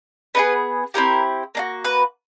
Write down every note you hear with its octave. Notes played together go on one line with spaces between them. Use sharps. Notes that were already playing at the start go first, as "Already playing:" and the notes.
B3 D#4 G#4 B4
C4 E4 G4 A#4
A#3 D4 F#4
B4